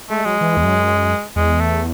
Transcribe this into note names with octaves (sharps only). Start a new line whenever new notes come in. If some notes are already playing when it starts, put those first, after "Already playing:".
G#3 A3
F#3 G#3
E3
E2
F#2
E2 G#3
A3